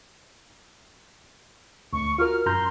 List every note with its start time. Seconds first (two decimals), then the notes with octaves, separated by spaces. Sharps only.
1.93 D2 C#6
2.18 F4 F#4 A#4 F6
2.46 F#2 A#5 C6 G6